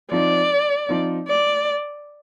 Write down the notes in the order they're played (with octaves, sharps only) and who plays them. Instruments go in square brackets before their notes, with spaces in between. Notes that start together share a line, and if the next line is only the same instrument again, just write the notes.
[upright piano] F3 C4 D#4 [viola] D5
[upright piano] F3 C4 D#4
[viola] D5